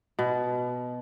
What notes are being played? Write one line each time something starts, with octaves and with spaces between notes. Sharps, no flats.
B2